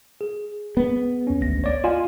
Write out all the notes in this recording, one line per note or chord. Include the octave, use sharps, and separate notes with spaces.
G#4
B3
D#2 C#4
G#1 D2 A#6
C#5 D5
F4 D#5 G#5